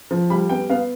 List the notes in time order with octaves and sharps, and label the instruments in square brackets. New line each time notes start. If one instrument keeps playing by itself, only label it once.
[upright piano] F3
G3 B5
B3 G5
B3 F5